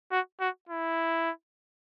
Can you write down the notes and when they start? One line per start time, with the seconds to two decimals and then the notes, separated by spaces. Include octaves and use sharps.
0.11 F#4
0.40 F#4
0.69 E4